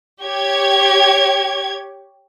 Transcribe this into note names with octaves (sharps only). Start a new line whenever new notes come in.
G4 C#5 G#6